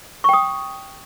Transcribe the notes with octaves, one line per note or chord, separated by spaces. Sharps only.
G5 C#6 D#6